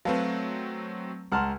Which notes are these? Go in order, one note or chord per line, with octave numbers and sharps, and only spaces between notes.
F#3 A3 C4 B4 F5 A5
C#2 F#5 A5 A#5 C6 F6